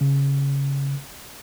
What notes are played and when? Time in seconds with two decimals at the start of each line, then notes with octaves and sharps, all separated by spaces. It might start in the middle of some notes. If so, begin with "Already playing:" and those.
0.01 C#3